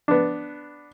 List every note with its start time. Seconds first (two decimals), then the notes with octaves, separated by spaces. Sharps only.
0.08 B3 D4